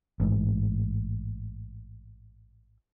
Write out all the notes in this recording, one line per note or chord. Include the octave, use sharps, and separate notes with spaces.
A1 G#2